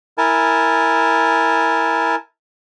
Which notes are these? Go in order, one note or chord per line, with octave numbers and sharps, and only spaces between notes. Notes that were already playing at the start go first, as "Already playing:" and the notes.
E4 A#4 G#5 A5